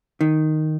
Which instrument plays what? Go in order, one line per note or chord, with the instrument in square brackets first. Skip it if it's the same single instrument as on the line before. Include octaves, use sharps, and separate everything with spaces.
[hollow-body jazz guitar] D#3